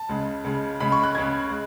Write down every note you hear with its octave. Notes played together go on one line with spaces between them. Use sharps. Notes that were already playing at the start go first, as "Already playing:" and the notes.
Already playing: A5
C#2 C#3 G#3
C#2 C#3 G#3
C#2 C#3 G#3 B5
C#6
F#6
C#2 C#3 G#3 G#6
G#3